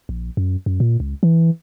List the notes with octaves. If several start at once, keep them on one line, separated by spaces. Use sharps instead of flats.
A#1
F#2
F#2
A#2
C#2
E3